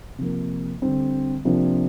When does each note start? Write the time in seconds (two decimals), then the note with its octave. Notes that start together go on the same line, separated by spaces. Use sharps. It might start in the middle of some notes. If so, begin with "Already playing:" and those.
0.18 C3 F3 A#3
0.82 D3 G3 C4
1.45 C3 F3 A#3 D4